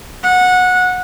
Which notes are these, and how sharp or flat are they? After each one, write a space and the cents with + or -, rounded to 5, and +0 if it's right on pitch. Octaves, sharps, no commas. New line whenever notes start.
F#5 -20